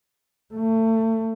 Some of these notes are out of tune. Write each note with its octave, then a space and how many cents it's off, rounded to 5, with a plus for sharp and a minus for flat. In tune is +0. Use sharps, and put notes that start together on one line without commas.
A3 +30